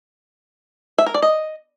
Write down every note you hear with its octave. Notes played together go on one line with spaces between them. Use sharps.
E5
A#4
D5
D#5